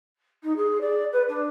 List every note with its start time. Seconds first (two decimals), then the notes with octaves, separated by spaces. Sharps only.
0.43 D#4
0.56 G#4
0.81 D5
1.12 B4
1.28 D4